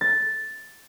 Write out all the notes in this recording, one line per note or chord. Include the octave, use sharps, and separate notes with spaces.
A6